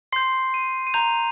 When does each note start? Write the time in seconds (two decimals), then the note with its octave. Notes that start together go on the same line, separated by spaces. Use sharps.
0.12 C6 G6 C7
0.54 D#7
0.87 D#7
0.94 A#5 G6 F7